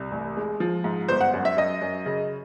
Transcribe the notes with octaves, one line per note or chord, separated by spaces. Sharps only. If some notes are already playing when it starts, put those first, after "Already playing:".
Already playing: C2
A1
G#3
F3
G#2
G1 C5
F#5
F#2
E5
F#2 D#5
F#2
C#3